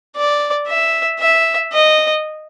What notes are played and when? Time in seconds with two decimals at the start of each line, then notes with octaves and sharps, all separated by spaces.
0.16 D5
0.67 E5
1.19 E5
1.73 D#5